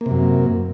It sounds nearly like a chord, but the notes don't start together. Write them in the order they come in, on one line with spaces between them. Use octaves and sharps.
A#3 C3 F#2